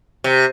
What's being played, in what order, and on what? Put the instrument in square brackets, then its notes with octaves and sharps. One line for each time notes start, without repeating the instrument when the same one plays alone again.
[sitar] C3